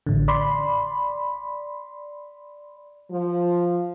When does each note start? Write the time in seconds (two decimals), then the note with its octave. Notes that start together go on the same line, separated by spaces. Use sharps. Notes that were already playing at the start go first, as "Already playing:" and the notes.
0.06 A1 D3
0.28 D5 B5 C6
3.11 F3